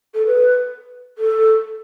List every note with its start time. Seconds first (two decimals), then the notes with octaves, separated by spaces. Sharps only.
0.15 A4
0.26 B4
1.18 A4